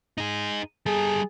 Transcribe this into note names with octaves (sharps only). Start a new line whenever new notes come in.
D#4 G#4
G3 G#4 A4